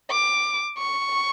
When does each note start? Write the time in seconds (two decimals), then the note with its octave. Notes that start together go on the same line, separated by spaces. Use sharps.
0.10 D6
0.78 C#6